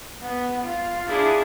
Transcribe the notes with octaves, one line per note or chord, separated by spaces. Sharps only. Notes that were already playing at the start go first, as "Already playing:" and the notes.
B3
F4
D4 E4 G#4